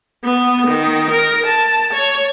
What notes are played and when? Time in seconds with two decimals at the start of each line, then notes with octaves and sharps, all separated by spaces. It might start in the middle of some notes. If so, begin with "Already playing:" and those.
0.25 B3
0.68 D#3
1.11 A#4
1.46 A5
1.93 C#5